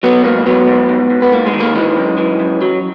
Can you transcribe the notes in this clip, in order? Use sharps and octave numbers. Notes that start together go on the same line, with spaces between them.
F#3 B3
G#2 A#3
F#3 B3
G#2
G#2
G#2
B3
G#2 A#3
G#3
D#3
A#3
E3 G#3
F#2
E3
F#2
F#3